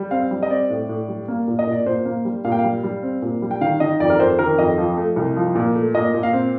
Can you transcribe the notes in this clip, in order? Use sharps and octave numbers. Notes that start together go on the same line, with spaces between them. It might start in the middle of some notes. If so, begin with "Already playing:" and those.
Already playing: G3
C4 F5
G3
D#5
C4 D5
A2
A2
G3
A#3
A#2
D#5
A#2
D5
A#2 C5
A#3
G3
A#2 F5
G5
F5
G3
G3
C4
A#2
G3
G5
D#3 F5
D#3 D#5
F2 D5
A#4
F2 C5
D#3 A#4
F2 D#5
F3
A3
C2
F3
A#2
A3
A#2 D#5
A#2
F5
C4